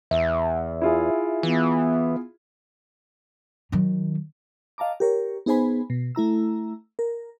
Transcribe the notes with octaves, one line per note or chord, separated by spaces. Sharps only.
E2 E5
E4 F4 G#4
E3 B3
D#3 F#3
D#5 F5 A5 A#5 D6
G4 A#4 C#5
B3 D#4 G#4 C5 G#5 B5
B2
A3 E4 A#5 E6
A#4